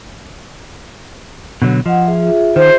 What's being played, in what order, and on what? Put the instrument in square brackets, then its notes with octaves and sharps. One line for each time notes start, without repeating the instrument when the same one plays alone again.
[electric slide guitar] B2 D3 F#3
[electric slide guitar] F3 [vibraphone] D#5 F#5
[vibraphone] F4 G#4 E5
[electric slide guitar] D#3 [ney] C5